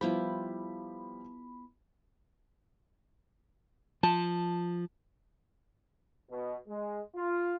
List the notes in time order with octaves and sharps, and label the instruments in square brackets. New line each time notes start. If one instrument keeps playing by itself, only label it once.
[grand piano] F3 G3 [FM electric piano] B3 B5 [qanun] E4 F4 G4
[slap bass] F3 [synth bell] A5
[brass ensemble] B2
G#3
F4